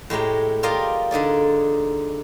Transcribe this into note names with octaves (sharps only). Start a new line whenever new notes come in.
A2 G#3 G4 A#5
F4 G4 A#4 D5 D#5 F5
D3 D#4 G#4 D5